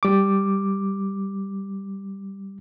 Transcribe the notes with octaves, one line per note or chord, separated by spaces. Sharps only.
G3 D6